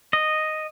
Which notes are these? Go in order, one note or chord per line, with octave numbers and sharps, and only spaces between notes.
D#5